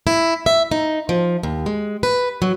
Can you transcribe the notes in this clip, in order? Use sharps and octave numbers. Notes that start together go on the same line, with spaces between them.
E4
E5
D#4
F3
D#2
G#3
B4
F#3